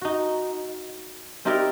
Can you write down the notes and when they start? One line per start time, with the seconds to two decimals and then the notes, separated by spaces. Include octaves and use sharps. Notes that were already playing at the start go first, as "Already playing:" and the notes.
0.01 D#4 F#4
1.45 C4 D#4 E4 G4 A#4 D5